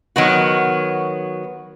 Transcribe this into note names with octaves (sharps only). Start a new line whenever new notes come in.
D#3 F#3 B3 F#4